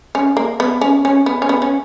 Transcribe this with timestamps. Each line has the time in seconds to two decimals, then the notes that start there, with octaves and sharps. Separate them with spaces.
0.15 C#4
0.37 A#3
0.60 B3
0.81 C#4
1.05 C#4
1.26 B3
1.42 C#4
1.49 B3
1.62 C#4